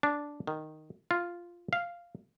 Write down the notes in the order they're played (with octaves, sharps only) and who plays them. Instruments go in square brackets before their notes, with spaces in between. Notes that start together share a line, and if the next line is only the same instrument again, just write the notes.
[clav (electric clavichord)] D4
D#3
F4
F5